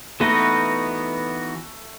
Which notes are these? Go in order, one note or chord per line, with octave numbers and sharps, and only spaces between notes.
E3 A3 B3 D#4 F#4 B4